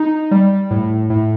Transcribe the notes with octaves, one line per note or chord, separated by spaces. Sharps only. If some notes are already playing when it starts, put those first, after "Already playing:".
Already playing: D#4
G3
A2
A2